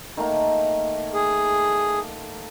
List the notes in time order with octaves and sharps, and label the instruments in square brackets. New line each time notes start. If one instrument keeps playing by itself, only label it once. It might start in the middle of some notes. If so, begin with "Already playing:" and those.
[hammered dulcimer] D#3 A3 A#3
[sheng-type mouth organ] G#4